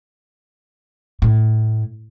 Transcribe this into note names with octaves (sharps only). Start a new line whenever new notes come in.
A2